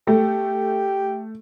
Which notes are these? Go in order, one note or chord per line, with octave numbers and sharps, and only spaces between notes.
A3 G4